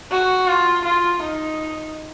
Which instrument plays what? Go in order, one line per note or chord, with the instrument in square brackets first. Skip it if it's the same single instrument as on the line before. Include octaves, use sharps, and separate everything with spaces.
[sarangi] F#4
F4
F4
D#4